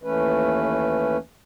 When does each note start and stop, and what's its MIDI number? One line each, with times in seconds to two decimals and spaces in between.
0.04 1.17 39
0.04 1.17 52
0.04 1.17 57
0.04 1.17 61
0.04 1.17 71